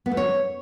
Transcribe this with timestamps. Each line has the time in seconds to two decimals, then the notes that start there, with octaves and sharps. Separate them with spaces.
0.06 B3
0.12 A3
0.17 C#5